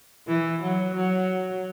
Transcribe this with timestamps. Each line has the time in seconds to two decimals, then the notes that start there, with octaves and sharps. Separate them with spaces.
0.27 E3
0.62 F#3
0.95 F#3